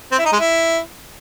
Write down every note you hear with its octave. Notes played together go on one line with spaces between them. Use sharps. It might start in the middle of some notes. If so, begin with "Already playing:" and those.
C4
E4
D#4
G#3
E4